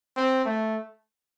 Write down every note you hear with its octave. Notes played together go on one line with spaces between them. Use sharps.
C4
A3